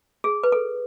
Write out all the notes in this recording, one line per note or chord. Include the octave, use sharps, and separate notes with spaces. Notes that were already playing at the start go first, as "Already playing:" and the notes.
G#4
B4
A4